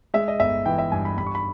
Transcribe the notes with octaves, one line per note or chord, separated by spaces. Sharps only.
G#3 E5
D#5
G1 E5
E3 G5
E5
G2 G#5
B5
G2 B5
C#6
B5